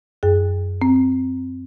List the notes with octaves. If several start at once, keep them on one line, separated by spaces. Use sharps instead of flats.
F#2 G#4
C4